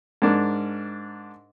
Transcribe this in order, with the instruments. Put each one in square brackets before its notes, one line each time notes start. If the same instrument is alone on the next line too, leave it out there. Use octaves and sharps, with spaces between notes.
[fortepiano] G#2 D4 A#4